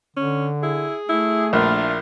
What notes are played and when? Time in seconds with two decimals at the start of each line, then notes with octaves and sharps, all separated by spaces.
0.16 D3 C#4
0.63 E4 G#4
1.09 A3 E4
1.53 A#1 D4 E4 F4 A#4